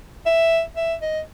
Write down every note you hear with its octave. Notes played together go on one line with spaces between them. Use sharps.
E5
E5
D#5